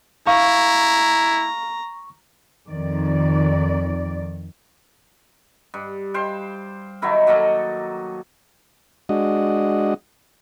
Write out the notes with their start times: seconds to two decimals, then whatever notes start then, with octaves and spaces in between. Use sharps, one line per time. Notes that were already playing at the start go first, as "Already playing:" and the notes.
0.27 E4 F5 A#5 C#6
2.68 F2 D#3 D5
5.74 G2
6.14 C5 F5 G5
7.02 D#3 F#3 E4 A#4
7.27 F#3 A#3 A4 D#5
9.09 G#3 D4 F#4 D#5